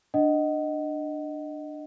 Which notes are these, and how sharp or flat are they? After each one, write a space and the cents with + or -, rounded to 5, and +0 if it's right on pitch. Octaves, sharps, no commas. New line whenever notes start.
D4 +15 D#5 +0 F#5 +25